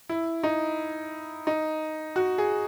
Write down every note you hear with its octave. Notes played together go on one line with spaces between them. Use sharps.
E4
D#4
D#4
F#4
G#4